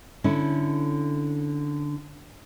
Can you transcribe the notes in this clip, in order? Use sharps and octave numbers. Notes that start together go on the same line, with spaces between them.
D3 C#4 E4